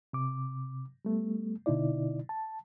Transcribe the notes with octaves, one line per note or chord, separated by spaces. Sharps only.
C3 D6
G3 A3 B3
B2 D3 D#4 E4 D5
A5